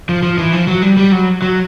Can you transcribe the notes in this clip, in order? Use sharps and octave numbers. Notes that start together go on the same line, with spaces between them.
F3
F3
E3
F3
F#3
G3
G3
F#3
F#3